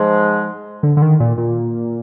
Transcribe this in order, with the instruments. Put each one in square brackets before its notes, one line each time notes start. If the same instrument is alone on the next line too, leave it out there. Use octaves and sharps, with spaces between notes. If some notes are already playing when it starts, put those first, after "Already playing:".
Already playing: [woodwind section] G#2 F3 G#3
[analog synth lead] D3
D3
D#3
A#2
A#2